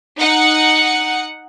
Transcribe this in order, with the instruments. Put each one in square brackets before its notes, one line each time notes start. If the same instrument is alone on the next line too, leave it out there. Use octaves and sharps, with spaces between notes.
[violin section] D#4 F#5